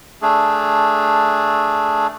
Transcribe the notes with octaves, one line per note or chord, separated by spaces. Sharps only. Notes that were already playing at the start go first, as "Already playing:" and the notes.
A3 D4 G#4